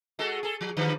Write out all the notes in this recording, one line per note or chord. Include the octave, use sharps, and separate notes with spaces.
G#3 F#4 A4
G#4 A4
F3
D3 F3 G3